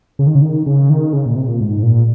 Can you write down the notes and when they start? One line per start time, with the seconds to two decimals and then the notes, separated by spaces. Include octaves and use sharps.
0.19 C#3
0.27 D#3
0.35 C#3
0.42 D#3
0.66 C#3
0.90 D#3
1.13 C#3
1.26 A#2
1.36 C3
1.48 A#2
1.60 G#2
1.83 A#2